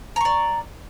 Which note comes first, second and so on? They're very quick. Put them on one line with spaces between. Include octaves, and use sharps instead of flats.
A#5 C#6 D5